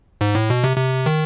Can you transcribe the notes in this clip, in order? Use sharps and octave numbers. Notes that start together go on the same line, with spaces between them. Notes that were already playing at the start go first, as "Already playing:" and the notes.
G#2
A2
B2
C3
C3
D#3